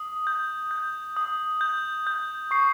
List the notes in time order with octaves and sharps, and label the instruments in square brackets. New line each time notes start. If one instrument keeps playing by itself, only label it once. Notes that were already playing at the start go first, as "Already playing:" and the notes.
Already playing: [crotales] D#6
G6
G6
D#6
G6
G6
C#6 C7